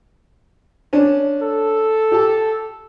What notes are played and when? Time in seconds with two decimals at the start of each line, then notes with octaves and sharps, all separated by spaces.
0.93 C#4 D4
1.42 A4
2.12 G4 A5